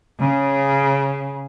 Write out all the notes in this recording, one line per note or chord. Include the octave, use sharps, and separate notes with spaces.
C#3